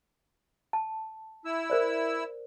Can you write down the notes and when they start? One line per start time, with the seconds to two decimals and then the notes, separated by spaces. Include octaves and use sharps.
0.73 A5
1.45 E4 E6
1.70 A#4 C5 D5